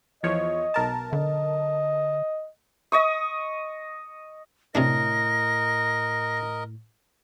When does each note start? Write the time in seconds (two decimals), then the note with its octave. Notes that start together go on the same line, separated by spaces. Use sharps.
0.23 E2 F3 C#5 D#5
0.74 B1 A#4 A5
1.13 D3 D#5
2.92 D#5 C#6 D#6
4.75 A2 C3 C4 D4 A#4 D#5 A#6